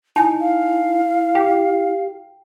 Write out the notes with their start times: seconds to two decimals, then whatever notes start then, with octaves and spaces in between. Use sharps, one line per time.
0.16 D#4 E4 G#5 A5
0.40 F5
1.35 G4 G5